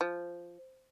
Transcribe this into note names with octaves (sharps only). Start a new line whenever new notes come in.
F3